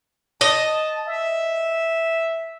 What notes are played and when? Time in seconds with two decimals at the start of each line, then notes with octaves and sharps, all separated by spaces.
0.41 D#5 A5
1.07 E5